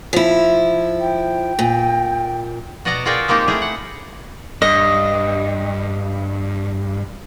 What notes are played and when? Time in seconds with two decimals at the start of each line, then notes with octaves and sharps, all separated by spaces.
0.13 F3 E4
1.01 G5
1.59 A#2
2.85 B2 F#4 D5 D#5 F#5 A#5
3.06 F4 F#4 G#4 A#4 D5 G5
3.28 G#3 A#3 C4 D#4 G4
3.48 A3 E4 G#4
3.62 F#5
4.62 G2 D#5